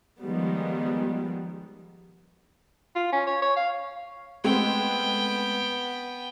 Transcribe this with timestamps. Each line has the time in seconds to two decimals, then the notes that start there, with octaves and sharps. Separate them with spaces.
0.21 D#3 F3 G3 G#3 B3
2.95 F4
3.12 C#4
3.27 C#5
3.42 C#5
3.56 F5
4.44 G#3 A3 B3 C4 G5